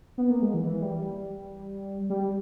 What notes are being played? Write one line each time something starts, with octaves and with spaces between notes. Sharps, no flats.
B3
A#3
G#3
E3
E3
G3
G3
G3